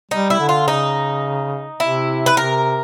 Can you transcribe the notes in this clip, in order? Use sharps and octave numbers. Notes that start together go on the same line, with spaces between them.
G3 D#4
E4
D3
F4
C#3 D#4
C3 E4
B4
C3 A#4